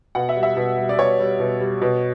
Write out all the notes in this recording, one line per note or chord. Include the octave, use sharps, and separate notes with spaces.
B2 F#5
E5
G3
E5
B2
G3
D5
B2 C#5
G3
B2
G3
B2